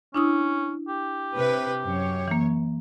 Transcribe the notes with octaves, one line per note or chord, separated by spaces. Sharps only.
C#4 D4 E4 D#6
G4
C3 B4
F#2 C#5
E3 A#3